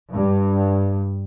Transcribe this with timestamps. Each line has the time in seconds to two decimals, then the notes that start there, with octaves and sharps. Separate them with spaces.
0.12 G2